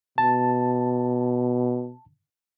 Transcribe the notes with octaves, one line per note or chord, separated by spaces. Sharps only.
B2 A5